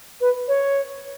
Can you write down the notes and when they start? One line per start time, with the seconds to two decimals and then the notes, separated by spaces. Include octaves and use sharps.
0.21 B4
0.48 C#5